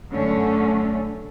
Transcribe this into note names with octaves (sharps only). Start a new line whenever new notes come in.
F#2 D3 A3 C#4